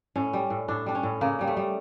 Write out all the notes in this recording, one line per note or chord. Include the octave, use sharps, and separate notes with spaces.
A2 C#4
G3
A2
A2 D4
G3 D4
C#4
A2
C#3 A#3
C#3 G3
A3
G3